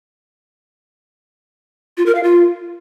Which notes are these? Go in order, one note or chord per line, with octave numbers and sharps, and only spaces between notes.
F4
A#4
F5
F4